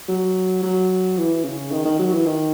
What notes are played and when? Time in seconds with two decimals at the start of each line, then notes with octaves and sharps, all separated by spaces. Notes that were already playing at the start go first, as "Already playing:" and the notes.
0.09 F#3
0.63 F#3
1.18 E3
1.44 C#3
1.72 D#3
1.85 D#3
1.99 F#3
2.13 E3
2.26 D#3